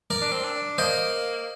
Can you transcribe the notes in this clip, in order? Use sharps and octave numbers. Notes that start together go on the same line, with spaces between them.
A#4 D5
D4
C4
D4
A#3 C5 D#5